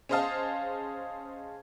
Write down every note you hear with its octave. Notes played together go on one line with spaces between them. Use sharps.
C#4 G#4 C5 D#5 F5 A5